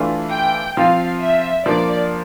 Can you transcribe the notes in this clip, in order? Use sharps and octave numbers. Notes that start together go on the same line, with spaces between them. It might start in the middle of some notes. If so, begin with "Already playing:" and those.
Already playing: E3 A3 D4 F4
G5
F3 C4 F4 F5
E5
F3 A#3 D4 D5